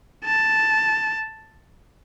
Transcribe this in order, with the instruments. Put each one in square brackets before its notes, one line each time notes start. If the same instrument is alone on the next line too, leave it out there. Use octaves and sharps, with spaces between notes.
[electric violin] A5